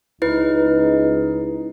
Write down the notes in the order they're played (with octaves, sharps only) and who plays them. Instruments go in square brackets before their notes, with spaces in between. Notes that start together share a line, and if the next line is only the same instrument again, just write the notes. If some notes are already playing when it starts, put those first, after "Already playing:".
[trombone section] C#2 D#4 [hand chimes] E4 B4